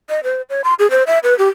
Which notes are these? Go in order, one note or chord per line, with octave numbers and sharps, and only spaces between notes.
D#5
C5
C#5
C6
G#4
C5
E5
B4
G4